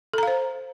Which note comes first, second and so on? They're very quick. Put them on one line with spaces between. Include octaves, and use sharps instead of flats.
A4 A#5 F5 C5